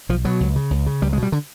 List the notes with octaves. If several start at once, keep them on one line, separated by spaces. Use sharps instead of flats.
B1 F3
B2 F#3
C#2
C#3
C#2
C#3
C#2 G3
G#3
B2
G3
D3